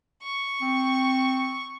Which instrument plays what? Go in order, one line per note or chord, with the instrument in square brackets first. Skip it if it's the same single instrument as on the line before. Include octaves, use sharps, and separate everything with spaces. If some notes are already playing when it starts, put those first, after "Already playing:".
[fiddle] C#6
[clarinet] C4